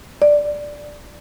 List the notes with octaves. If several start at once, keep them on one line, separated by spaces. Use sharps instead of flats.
D5